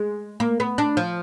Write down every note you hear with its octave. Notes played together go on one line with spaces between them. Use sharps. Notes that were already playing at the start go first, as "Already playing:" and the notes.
Already playing: G#3
A#3
B3
D4
F3